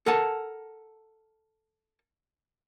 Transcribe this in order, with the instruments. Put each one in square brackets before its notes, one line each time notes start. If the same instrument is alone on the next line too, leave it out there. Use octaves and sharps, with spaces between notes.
[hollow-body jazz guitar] A4 A#4 F#5 G#5 A5